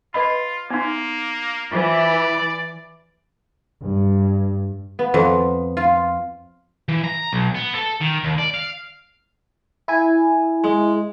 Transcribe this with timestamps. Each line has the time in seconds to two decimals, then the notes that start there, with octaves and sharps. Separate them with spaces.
0.14 F4 B4 D#5 B5
0.71 A#3 B3 D#4
1.72 E3 F4 C5 D5
3.81 G2
4.99 B3
5.14 F2
5.77 F4
6.89 E3
7.04 A#5
7.33 B1
7.55 B3
7.76 A4
8.01 D#3
8.24 D#2
8.38 D5
8.54 F5
9.88 E4 G#5
10.64 G#3